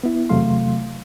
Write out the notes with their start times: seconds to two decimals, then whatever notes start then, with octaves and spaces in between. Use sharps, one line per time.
0.03 B3 E4
0.29 E2 C3 F#3 A3 F5 C6